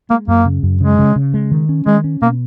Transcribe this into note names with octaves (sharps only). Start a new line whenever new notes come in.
G#3 A#3
F#2 A#3
C#3
F#2
C#3 G#3
C#3
C#3
G#3
D#3
C#4
D#3 G#3
C#4
B2 A#3